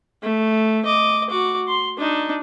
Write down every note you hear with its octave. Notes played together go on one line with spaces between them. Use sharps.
A3
D#5 D6
F#4 D6
C6
D4 D#4